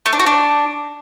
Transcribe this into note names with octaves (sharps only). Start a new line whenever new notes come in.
A3
D4
F#4
D4